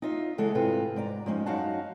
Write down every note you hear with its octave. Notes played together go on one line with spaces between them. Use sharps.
D#4 F4 E5
C#3 E3 G#3 G#4 A4 F#5
G#2 C3 F4 B4
G#2 D5 A#5
F3 G#3 C4 C#4 D#4
F#2 D#4 F#4 F5 F#5 A5